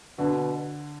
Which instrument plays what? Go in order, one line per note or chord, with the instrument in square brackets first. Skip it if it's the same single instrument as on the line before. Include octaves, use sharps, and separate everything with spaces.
[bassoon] B2 [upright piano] D3